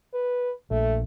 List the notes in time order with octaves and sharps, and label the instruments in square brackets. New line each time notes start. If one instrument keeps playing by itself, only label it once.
[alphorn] B4
[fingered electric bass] A#1 [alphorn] A3